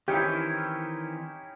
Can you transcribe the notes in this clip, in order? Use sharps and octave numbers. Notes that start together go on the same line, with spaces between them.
D#3 E3 C4 C#4 D#4 E4 G4 G5